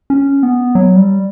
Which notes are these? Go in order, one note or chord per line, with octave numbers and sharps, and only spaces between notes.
C#4
B3
F#3
G3